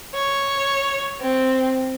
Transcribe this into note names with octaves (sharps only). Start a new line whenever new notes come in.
C#5
C4